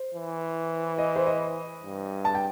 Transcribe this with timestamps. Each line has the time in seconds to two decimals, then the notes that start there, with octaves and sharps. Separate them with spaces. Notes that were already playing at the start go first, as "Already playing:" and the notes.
Already playing: C5
0.14 E3
0.98 D#5
1.16 C5
1.26 D#5
1.84 G2
2.25 A5
2.35 G5